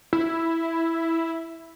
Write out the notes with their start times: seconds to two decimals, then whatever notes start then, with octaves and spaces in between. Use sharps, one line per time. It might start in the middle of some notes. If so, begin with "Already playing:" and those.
0.13 E4